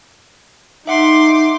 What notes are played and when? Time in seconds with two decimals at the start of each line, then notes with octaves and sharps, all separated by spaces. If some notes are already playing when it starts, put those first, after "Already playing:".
0.87 D#4 E5 F#5 C6 D6